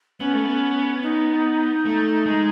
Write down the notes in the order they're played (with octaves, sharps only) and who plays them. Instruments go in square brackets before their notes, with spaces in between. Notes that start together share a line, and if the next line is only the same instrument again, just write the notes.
[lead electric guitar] B3 [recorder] C#4
[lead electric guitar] A3
B3
[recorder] D#4
[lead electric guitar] A3
G#3